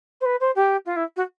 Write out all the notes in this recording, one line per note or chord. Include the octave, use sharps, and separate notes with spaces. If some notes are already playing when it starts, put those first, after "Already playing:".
C5
B4
C5
G4
F4
E4
F#4